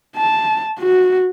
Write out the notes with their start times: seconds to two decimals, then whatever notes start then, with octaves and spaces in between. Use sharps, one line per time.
0.16 A5
0.80 F#4